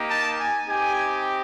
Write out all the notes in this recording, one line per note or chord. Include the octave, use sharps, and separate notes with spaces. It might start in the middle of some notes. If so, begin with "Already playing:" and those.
Already playing: A#3 D#4 G4
A5
G#5
C4 D#4 G4 G#5